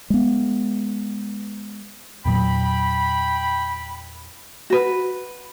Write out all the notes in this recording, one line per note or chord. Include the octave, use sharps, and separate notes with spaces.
G#3 B3
E2 A#2 F#3 G5 B5
F#4 B4